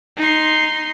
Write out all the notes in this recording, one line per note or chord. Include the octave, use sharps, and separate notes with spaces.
D#4 C6